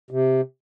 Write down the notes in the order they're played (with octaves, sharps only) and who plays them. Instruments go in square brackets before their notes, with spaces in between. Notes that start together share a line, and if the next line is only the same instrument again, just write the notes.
[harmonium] C3